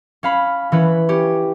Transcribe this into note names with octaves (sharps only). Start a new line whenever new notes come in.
C#4 F5 B5
E3 C#4 B4
C#4 G4